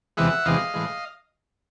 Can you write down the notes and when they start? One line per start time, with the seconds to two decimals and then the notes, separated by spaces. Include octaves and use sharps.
0.17 E2 C3 E3 G#3 E5 F#5
0.45 E2 C3 E3 G#3 D#5 F5
0.74 A2 E3 G#3